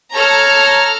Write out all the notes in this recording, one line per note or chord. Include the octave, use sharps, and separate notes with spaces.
A4 C#5 A#5 F6